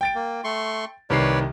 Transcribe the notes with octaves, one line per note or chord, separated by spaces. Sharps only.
G5 A6 D7
A#3
A3 C6 C#6
C2 D#3 B4 C#5 D5 C7